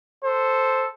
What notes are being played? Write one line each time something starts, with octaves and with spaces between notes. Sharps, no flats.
A4 C5